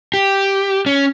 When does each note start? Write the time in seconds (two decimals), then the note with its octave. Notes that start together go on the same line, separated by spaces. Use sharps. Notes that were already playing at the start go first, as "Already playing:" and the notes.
0.14 G4
0.86 C#4